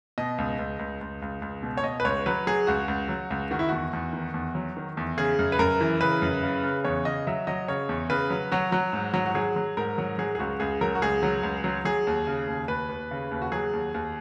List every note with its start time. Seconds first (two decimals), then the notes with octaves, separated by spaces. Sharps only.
0.18 B2 D#5
0.38 C#2
0.59 C#2
0.79 C#2
1.01 C#2
1.22 C#2
1.42 C#2
1.63 B2
1.77 C#5
1.84 B2 D#5
2.00 B4
2.05 C#2 C#5
2.26 F#3 B4
2.47 F#3 G#4
2.67 C#2 F#4
2.88 C#2
3.09 F#3
3.30 C#2
3.51 D#3 F#4
3.59 E4
3.69 E2 F#4
3.93 E2
4.13 D#3
4.34 E2
4.55 F#3
4.77 D#3
4.97 E2
5.18 C#3 G#4
5.39 F#2
5.52 B4
5.59 F#2 A#4
5.81 E3
6.01 C#3 B4
6.22 F#2
6.43 C#3
6.63 C#3
6.84 E2 C#5
7.05 C#3 D#5
7.27 F#3 E5
7.47 F#3 D#5
7.68 C#3 C#5
7.89 E2
8.10 C#3 B4
8.30 F#3
8.52 F#3 F#4
8.72 F#3
8.93 G#2
9.14 F#3
9.26 F#4
9.35 F#3 G#4
9.56 F#3
9.77 G#2 A#4
9.98 F#3
10.18 F#3 G#4
10.35 G#4
10.39 C#2 F#4
10.60 C#2 G#4
10.81 F#3 A#4
10.95 F#4
11.02 C#2 G#4
11.23 F#3
11.43 C#2
11.64 F#3
11.85 F#3 G#4
12.07 D#2
12.27 C#3
12.47 D#2
12.68 D#2 B4
12.89 D#2
13.11 C#3
13.31 D#2
13.42 F#4
13.52 F#3 G#4
13.73 D#2
13.94 D#2